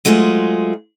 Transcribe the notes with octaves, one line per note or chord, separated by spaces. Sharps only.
F#3 G#3 A3 F4 G#4 C5